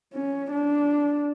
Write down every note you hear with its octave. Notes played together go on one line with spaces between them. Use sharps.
C#4
D4